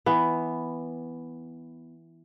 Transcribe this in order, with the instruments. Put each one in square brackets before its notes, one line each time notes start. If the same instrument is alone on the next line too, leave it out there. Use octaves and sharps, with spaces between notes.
[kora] E3 B3